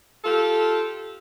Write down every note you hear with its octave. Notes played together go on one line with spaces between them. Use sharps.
F4 G4 A4